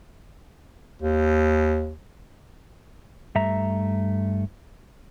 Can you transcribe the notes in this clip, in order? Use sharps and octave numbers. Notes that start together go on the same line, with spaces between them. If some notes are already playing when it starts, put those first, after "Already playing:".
D#2
G2 A3 E5 A#5